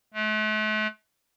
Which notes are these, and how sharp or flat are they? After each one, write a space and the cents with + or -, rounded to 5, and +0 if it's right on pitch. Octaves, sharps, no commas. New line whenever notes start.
A3 -40